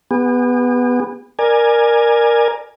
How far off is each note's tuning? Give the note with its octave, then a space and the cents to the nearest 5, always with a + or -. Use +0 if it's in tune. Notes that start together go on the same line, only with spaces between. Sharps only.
B3 +0 G#4 -45
A#4 +5 D5 +25 G#5 +0